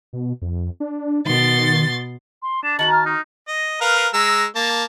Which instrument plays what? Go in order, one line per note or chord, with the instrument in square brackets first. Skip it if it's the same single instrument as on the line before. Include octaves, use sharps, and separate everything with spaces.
[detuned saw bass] B2
F2
D4
[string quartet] B2 C6 A6 [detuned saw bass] D#3
[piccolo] C6
[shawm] D4 [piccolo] E7
[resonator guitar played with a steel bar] D#3 F#4 A#5 [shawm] A5 [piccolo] F#7
[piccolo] F6
[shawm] D#4
[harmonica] D#5
A#4 B4 F5
G#3 A#5 E6
A#3 A5